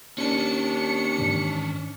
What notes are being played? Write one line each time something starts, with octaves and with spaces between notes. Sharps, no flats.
D#2 C#4 D4 C#7
G#2 D#3 E3